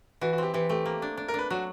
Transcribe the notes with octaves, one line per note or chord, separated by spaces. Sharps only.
E3 F#4
F#4
C4 G4
E3 G4
A3 G4
A#3
D4
D4
A#4
D4 B4
F#3 F#4